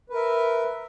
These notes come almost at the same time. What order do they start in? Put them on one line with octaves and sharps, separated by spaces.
B4 A#4 E5